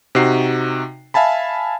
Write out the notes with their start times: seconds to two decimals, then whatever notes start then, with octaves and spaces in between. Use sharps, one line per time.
0.15 C3 D#4 F#4 C7
1.14 E5 F5 G#5 A5 B5